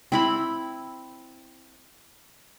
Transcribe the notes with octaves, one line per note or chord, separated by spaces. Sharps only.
C4 E4 B5